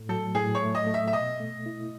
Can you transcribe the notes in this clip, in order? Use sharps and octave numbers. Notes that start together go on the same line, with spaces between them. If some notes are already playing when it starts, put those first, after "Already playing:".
Already playing: A2 A3
F#3 A4
A2 G#4
C#5
A3
D#5
A3
E5
E5
B2 D#5
A3
E4